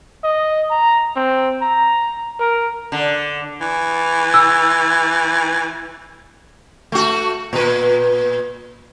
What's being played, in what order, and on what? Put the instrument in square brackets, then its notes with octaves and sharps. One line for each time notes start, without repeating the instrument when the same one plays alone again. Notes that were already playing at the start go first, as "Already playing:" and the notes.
[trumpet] D#5
A#5
C4
A#5
A#4
[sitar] D3
[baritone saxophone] E3
[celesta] E6
[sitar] A3 F#4
A#2 B4